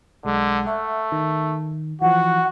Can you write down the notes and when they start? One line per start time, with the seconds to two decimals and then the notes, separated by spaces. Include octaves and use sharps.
0.25 B1 D3 G#3
0.66 A3 E5 F#5
1.12 D#3
2.02 E3 F3 F#4 F#5